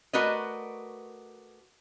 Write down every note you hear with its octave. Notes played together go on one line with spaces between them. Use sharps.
A3 F#4 A#4 B4 D5 D#5